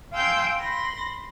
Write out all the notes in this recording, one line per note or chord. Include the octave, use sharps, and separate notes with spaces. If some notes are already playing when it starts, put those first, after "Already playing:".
F5 G5 G#5 C6 E6 G6
B5 C6 A#6